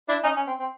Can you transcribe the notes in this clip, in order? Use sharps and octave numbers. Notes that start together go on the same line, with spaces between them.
D4 E4
C#4 D#4
C#4
C4
C4